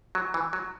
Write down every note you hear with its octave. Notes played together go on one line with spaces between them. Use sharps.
F#3
E3
F#3